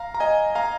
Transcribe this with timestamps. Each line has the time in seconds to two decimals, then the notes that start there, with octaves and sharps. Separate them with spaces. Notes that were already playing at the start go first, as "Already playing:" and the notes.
Already playing: F5 A#5
0.14 A#5
0.20 D#5 G#5
0.55 F5 A#5